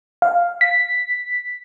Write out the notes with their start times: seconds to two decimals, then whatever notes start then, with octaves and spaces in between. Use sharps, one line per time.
0.22 F5
0.61 B6